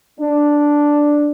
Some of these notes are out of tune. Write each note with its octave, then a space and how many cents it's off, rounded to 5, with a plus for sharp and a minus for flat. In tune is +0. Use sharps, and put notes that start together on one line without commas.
D4 +0